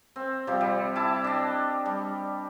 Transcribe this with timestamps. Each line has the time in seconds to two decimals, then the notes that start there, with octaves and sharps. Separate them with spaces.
0.16 C4
0.47 C3 F3 G3
0.61 G3
0.96 E4 A5 D6
1.24 D4 D#5
1.86 G3